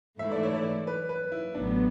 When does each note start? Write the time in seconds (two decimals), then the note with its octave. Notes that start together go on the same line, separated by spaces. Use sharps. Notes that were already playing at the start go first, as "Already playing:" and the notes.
0.19 G#2 E3 A3 E4 E5
0.32 D5
0.43 C#5
0.55 D5
0.87 B4
1.09 B4
1.32 E4
1.54 A1 A2 F#3 B3 D4